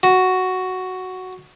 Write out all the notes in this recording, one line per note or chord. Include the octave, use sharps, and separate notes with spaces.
F#4